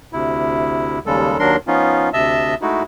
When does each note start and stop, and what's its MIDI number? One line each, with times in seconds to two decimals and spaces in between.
0.13 0.99 38
0.13 0.99 48
0.13 0.99 64
1.06 1.37 39
1.06 1.37 49
1.06 1.37 55
1.06 1.37 56
1.06 1.37 69
1.39 1.56 39
1.39 1.56 54
1.39 1.56 62
1.39 1.56 70
1.39 1.56 84
1.67 2.09 53
1.67 2.09 59
1.67 2.09 61
1.67 2.09 63
1.67 2.09 65
2.13 2.55 38
2.13 2.55 48
2.13 2.55 75
2.13 2.55 76
2.13 2.55 81
2.13 2.55 88
2.62 2.83 56
2.62 2.83 57
2.62 2.83 63
2.62 2.83 64
2.62 2.83 66